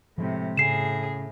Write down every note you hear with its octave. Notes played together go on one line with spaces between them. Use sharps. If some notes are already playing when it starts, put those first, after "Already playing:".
A2 C3 F3 G#3 C4
A2 C#3 G#4 C7 E7